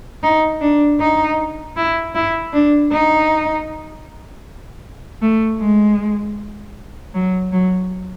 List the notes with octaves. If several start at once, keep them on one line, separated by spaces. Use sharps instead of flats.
D#4
D4
D#4
E4
E4
D4
D#4
A3
G#3
F#3
F#3